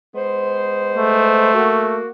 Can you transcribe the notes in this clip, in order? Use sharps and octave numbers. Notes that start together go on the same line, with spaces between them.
G#3 B3 C5
A3
A#3 F#4